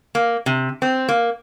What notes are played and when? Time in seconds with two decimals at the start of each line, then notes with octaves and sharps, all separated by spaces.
0.15 A#3
0.46 C3
0.82 C4
1.09 A#3